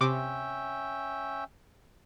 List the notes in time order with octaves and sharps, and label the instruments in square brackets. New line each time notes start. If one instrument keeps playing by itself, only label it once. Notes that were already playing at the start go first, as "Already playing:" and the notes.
[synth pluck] C3 D6 [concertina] C#4 E5 G5